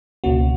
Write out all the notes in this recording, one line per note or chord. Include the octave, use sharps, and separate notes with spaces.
C#2 B2 A#3 C#4 F#4